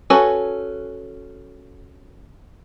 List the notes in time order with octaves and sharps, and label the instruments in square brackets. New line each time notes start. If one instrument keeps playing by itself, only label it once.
[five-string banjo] C#4 F#4 A4 B4 G#5